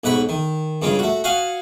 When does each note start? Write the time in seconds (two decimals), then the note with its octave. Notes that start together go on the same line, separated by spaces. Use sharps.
0.04 B1 G#2 F#5 B5 C#6
0.29 D#3
0.82 G2 C#3 G#3 F4
0.99 A3 F#4
1.24 F#4 D#5 F5 F#5 G#5